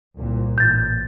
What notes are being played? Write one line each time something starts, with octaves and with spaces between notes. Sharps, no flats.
C2 A#2
A1 G6 A6